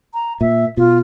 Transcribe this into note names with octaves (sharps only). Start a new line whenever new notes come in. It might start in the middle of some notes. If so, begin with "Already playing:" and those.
A#5
A#2 E5
B2 F4